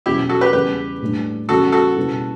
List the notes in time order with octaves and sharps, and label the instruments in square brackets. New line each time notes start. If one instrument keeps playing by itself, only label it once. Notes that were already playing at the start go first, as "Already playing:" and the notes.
[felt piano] E2 B2 F#3 C#4 [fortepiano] E4 G4
[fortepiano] F#4 A4
G4 B4
[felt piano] E2 C#3 G3 [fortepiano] G4 B4
[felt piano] A2 G3 D4
[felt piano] E2 C#3 G3 C#4 [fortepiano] F#4 A4
[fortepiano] F#4 A4
[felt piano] C#2 B2 G3 B3 E4